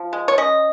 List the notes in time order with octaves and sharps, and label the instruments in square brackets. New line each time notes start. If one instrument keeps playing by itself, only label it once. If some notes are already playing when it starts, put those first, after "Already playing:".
Already playing: [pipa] F3
G#3
C#5
C#4 D#5